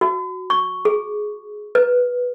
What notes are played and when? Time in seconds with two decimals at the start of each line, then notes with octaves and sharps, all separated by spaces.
0.01 F#4
0.50 C#6
0.85 G#4
1.75 B4